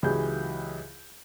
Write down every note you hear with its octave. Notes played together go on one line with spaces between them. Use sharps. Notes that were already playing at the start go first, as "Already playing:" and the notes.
C#2 E3 F#3 G4 G#4 G6